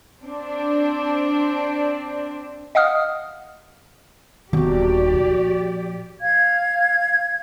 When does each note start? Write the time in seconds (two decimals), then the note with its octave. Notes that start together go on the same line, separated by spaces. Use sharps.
0.25 C4 D4
2.75 D#5 F5 F#5 D#6 F6
4.53 D#1 D#2 D#3 B3 C4 F#4 G4 D5
5.14 A#2 F3
6.22 F5 G#6